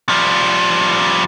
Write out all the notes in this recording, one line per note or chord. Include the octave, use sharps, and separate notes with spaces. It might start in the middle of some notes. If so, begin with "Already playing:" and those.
F3 G3